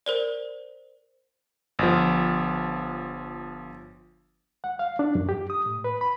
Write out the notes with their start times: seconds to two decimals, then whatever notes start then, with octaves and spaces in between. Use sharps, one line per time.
0.06 A#4 C5 D5
1.79 G1 F3
4.64 F#5
4.79 F5
4.99 D4
5.15 F#2
5.29 G4
5.50 D#6
5.66 A2
5.84 B4
6.01 B5